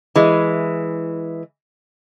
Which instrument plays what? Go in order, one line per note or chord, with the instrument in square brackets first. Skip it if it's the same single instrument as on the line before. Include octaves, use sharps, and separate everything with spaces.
[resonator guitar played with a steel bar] E3 G#3